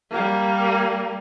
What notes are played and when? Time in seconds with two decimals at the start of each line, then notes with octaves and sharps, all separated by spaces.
0.11 G3 A#3